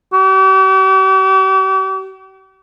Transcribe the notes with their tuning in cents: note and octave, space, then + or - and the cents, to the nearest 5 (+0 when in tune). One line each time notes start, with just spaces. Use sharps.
G4 -45